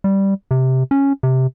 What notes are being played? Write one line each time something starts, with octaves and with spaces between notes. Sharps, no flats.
G3
C3
C#4
C3